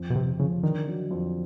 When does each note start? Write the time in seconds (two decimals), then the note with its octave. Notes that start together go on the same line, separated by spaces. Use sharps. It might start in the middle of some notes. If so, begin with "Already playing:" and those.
Already playing: F2
0.10 B2
0.14 F2 C3
0.39 C#3 F3
0.63 D3 D#3
0.87 F#3
1.11 F2